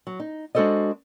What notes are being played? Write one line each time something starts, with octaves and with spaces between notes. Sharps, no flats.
F#3
D#4
G#3 D4 F#4 A4 C5 D#5